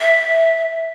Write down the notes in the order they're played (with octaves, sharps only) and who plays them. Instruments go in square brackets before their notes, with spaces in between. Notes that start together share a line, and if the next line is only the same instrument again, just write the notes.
[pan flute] E5